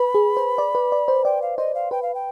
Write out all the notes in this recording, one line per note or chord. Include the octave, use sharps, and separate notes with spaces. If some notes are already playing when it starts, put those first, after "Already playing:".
Already playing: B4 B5
G#4
C5
D5
B4
D5
C5
D5 G5
F5
C5 D#5
F5
B4 G5
F5
G5